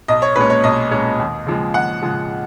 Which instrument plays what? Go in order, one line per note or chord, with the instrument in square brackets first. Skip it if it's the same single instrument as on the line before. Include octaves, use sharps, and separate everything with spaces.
[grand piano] B1 D#5
C#5
A#2 G#3 C#4 B4
C#5
B1 D#5
A#2 G#3 C#4
D#2
C#3 F3 G#3
D#2 F#5
C#3 F3 G#3